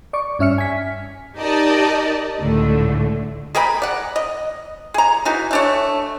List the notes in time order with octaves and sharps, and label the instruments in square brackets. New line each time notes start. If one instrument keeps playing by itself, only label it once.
[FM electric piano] D5 C#6 D6
G2 C#4 E5 F6 C#7
G#5 B6
[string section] D#4 G4 A#4 D5 D#5 A5
C#2 A2 D3 A3
[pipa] G#4 A#4 G5 B5
D5 F#5
D#5
G#4 A#5
E3 D#4 F#4
A3 D4 C#5